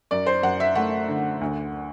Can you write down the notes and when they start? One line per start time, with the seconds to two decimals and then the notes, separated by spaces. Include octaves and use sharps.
0.11 F#2 D5
0.26 C5
0.43 F#2 F#5
0.60 E5
0.75 A3 F#5
1.08 D3
1.41 D2